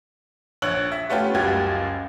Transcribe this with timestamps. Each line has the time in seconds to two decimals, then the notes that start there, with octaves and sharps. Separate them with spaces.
0.62 A#1 C#5 F#6 F#7
0.92 E5
1.10 A3 B3 C#4 F4 G4
1.34 F#1 C#2 G3 F#4 G4 G#6